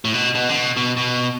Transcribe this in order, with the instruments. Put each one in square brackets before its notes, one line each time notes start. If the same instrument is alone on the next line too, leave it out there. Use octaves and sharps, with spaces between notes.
[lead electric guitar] A2
B2
B2
D3
B2
B2
B2